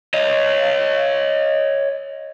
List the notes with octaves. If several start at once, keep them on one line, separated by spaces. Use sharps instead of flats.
C#5 D#5